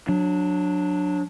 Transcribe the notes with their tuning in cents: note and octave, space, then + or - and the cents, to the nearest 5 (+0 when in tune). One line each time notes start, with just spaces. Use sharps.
F#3 -20 D4 +0